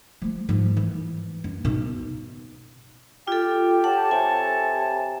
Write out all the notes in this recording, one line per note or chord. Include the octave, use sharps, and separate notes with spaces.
F3 A3
G#2 F3
E3
F#2
B2 D#4
F4 G4 A4
A4 C#5 F#5 A5
C3 G#5